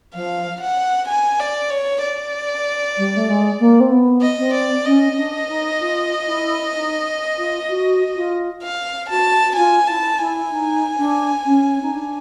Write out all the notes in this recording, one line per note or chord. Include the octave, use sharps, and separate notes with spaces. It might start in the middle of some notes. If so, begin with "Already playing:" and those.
F3 F5
F#5
G#5
D5
C#5
D5
G3
A3
G#3
A#3
C4
B3
D#5
C4
D5
C#4 D#5
D4
D#4
F4
E4
D#4
F4
F#4
F4
F5
F#4 A5
F4 G#5
E4 A5
E4 G#5
D#4
D4
C#4
D#4
D4